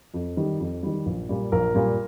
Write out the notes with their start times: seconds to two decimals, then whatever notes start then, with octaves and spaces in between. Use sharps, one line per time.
0.14 F2
0.37 D#3 G3 G4
0.60 F2
0.83 D#3 G3
1.06 A#1
1.29 A#2 G3
1.52 A#1 A#4
1.75 A#2 G3